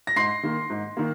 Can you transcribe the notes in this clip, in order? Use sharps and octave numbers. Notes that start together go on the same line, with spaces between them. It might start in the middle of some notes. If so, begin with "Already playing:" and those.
A#6
G#2 C6 C7
D#3 A#3
G#2
D#3 A#3